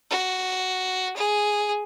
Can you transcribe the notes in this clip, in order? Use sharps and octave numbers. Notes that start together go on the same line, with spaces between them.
F#4
G#4